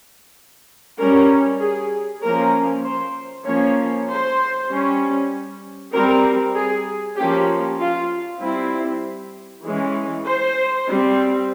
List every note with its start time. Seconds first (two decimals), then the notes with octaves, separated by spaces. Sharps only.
0.99 G3 C#4 A#4
1.60 G#4
2.22 F3 A#3 C#4 A#4
2.84 C5
3.46 F3 A#3 C#4 C#5
4.08 C5
4.70 G3 C#4
5.93 G3 C4 A#4
6.55 G#4
7.17 F3 A#3 C#4 G4
7.79 F4
8.40 G3 C4 E4
9.64 E3 G#3 C#4
10.25 C5
10.88 G3 C4